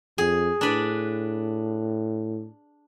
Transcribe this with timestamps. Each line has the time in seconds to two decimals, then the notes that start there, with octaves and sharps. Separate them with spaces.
0.18 F2 G#4
0.61 A2 D4 B4 D5